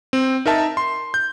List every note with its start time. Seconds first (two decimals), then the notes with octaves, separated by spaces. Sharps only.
0.13 C4
0.46 D#4 A#4 E5 A5
0.77 C6
1.14 G6